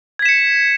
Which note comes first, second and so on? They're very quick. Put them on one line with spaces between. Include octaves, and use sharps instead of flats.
G#6 B6 E7 C#7